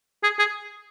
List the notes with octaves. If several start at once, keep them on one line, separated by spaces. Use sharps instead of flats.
G#4
G#4